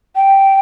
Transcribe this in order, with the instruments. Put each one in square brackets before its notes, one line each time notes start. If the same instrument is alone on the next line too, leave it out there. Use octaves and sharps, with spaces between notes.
[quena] G5